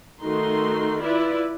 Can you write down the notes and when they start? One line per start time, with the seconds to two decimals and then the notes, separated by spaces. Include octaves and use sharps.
0.22 D#3 A3 D#4 F#4 C6
1.00 E4 F4 B4 D5